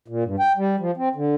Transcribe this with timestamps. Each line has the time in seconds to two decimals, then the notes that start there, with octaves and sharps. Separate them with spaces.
0.08 A#2
0.24 G2
0.39 G5
0.57 G3
0.80 F3
0.97 C4
1.15 D3